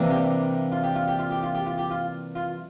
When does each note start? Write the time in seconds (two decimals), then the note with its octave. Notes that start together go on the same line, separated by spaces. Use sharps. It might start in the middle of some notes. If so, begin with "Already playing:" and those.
Already playing: C3 E3 G3 A#3 D4
0.10 G4
0.72 F4
0.83 G4
0.96 F4
1.08 G4
1.19 F4
1.31 G4
1.43 F4
1.55 G4
1.66 F4
1.78 G4
1.91 F4
2.35 F4